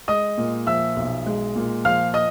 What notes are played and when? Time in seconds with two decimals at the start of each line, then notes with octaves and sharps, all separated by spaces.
0.08 G#3 D#5 D#6
0.38 A#2
0.67 F3 E5 E6
0.97 B1
1.26 G#3
1.56 A#2
1.84 F3 F5 F6
2.14 D#5 D#6